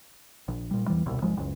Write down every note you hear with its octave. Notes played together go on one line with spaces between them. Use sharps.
A#1
A#2 G3
E2 E3 G3
D#1 C2 B2
G#1 F3 G#3
F#1 C#2